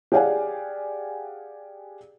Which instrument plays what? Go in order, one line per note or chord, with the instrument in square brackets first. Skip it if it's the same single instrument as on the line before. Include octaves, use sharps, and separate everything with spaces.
[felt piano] G4 G#4 D5 F5 F#5 G#5